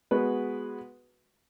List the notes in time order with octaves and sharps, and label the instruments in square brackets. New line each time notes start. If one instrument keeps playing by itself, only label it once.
[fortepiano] G#3 B3 F#4 B4